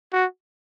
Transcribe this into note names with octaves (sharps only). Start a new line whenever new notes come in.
F#4